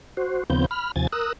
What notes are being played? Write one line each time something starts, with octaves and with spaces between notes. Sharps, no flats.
F#4 C5
D#2 C#3 F3 B3 C4 G6
B5 F6
D#2 C3 F3 G#5 G#6 A6
A#4 D#6 E6 F#6